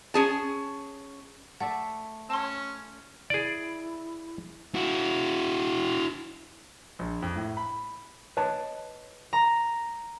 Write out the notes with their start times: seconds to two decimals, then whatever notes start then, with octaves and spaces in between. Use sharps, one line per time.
0.14 C#4 G#4 A5
1.60 A3 D5 E5 F#5
2.30 C#4 A5 C6
3.30 E4 G#4 D5
4.75 E4 F#4
6.99 A#1
7.22 F2
7.36 A2
7.57 B5
8.37 B4 C#5 D#5 A5
9.33 A#5